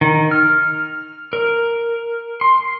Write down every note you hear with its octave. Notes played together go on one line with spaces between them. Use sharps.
D#3
F6
A#4
C6